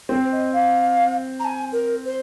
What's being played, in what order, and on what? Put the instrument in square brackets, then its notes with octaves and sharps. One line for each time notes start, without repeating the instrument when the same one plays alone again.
[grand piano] C4 [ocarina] C5
[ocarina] D#5
F5
A#5
G#5
A#4
C5